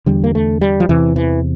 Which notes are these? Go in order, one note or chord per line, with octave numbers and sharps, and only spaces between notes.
E2 D3 G3
A#3
A3
G3
F3
E2 C3 E3
E3